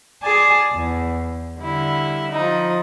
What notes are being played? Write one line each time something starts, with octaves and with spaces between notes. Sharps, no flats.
G#4 D5 G#5 A5
E2
D3 G3 E4
F3 D#4